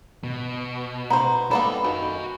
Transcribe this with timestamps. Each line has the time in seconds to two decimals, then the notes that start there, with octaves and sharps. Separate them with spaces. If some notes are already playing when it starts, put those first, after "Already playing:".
0.24 B2
1.10 B3 C5 A#5
1.51 G3 A#3 B3 A4 B5
1.84 D#3 F#4 G#5